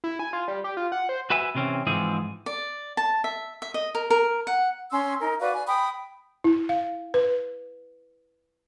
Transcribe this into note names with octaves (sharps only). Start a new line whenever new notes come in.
E4
G#5
F4
G3
G4
F4
F#5
C5
F#4 B4 E5 G#5
C3 E3 C4 C#4
G#2 E3 F3 G#3 C4 G#4
D5
A5
E5
E5
D#5
A#4
A#4
F#5
C#4 C6 E6
D#4 A#4
F#4 B4 D5 F5
G#5
G5 B5 D#6
E4
F5
B4